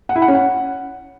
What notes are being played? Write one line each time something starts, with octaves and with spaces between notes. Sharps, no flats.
F#5
E4
F#5
C#4
F#5